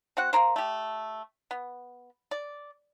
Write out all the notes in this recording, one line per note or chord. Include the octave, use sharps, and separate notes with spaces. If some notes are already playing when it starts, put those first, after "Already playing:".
C4 F#4 F#5
A#3 B3 A#4 C5
A3 G4
B3
D5